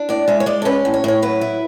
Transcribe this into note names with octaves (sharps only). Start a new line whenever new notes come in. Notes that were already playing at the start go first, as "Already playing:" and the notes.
Already playing: D4
A2 D5
G#3 E5
C#5
G#3 D5
A4
C#4 B4
A2
C#5
A2 C#5
F#3 B4
E4